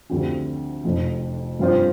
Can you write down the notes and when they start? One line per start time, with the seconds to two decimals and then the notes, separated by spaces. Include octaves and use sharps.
0.10 D2 D3 F3 C4 G4
0.84 F1 F2 F3
1.59 G2 F3 C4 F4 C5